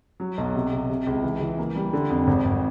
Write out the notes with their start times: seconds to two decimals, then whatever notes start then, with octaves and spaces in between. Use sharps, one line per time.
0.20 F#3
0.38 B1
0.55 C3
0.73 C3
0.90 C3
1.07 C#2
1.23 E3
1.41 E3
1.58 A#3
1.75 G3
1.93 D3
2.10 F2
2.27 G#1
2.45 G#1